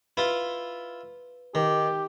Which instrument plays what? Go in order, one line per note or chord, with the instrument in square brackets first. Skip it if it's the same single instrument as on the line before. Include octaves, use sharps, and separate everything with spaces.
[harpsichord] E4 F4 [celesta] B4
[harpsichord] D#3 [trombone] G4